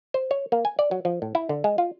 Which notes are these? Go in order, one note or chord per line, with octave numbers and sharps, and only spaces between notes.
C5
C#5
A#3
G#5
D5
F#3
F3
A2
E4
D3
G#3
F4